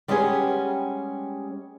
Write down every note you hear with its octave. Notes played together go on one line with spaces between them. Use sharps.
G3 G#3 B3 C#4 G4 G#4